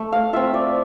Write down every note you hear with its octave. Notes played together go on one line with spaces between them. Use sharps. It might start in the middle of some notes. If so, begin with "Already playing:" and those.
Already playing: A3
F5
C4 F4 E5
D5